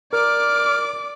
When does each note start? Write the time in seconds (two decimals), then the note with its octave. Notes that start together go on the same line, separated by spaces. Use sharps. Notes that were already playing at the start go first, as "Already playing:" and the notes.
0.13 A#4 D5 D6 F6